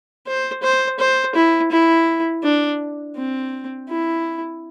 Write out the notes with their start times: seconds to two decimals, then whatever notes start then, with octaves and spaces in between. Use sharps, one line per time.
0.27 C5
0.63 C5
0.99 C5
1.35 E4
1.71 E4
2.43 D4
3.16 C4
3.89 E4